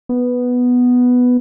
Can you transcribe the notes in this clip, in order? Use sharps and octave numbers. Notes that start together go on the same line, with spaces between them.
B3